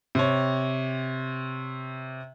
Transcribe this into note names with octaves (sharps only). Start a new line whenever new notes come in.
C3 C#5